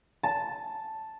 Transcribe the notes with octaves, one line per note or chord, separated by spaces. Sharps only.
A5